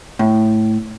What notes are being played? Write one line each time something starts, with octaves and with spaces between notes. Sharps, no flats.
A2